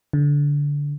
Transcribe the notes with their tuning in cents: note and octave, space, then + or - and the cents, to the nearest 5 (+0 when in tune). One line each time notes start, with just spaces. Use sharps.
D3 -20